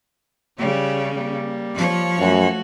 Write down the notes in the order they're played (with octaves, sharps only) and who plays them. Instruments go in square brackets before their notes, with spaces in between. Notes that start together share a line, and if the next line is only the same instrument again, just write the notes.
[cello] C#3 [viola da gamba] G3 C#5
[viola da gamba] G3 A#3
[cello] F3 C#5
[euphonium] F#2 [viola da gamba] A3 F#4